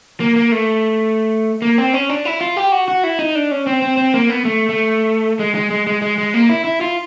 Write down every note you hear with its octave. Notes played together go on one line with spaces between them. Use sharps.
A#3
A#3
A3
A#3
C4
C#4
D4
E4
F4
G4
F#4
F#4
E4
D#4
D4
C#4
C4
C4
C4
A#3
B3
A3
A3
G#3
G#3
G#3
G#3
G#3
G#3
A#3
E4
E4
F4